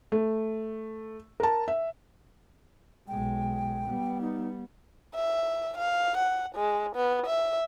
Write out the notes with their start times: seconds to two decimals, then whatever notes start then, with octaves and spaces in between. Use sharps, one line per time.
0.12 A3
1.40 A#4 A5
1.68 E5
3.08 B1 G#3 G5
3.86 G3 B3
4.21 D#4
5.15 E5
5.78 F5
6.17 F#5
6.55 G#3
6.96 B3
7.27 E5